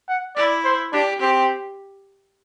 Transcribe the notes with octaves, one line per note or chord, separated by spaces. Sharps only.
F#5
E4 D5
C5
D4 G4
C4 G4